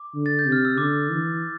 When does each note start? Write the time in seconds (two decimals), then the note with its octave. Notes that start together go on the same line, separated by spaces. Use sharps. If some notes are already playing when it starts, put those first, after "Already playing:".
Already playing: D6
0.15 D3
0.26 A6
0.39 G6
0.46 C3
0.52 F6
0.65 E6
0.78 D3 D6
1.11 E3